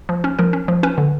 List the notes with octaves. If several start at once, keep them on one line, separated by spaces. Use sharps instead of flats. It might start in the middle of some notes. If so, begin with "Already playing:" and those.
F3
C#4
F3 A#4
C#4
F3
C#4 B4
D3